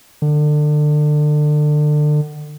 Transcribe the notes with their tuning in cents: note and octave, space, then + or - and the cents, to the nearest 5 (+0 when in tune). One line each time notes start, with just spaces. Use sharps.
D3 +30